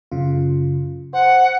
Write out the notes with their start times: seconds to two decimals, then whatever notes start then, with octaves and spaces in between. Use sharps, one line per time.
0.11 F#2 C#3 F4
1.13 C5 F#5